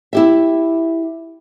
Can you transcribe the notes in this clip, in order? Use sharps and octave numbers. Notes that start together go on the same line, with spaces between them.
E4 G4 E5